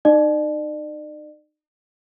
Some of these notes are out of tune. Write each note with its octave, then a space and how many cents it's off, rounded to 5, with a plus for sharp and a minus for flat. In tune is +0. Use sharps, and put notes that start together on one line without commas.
D#4 -30 D5 +40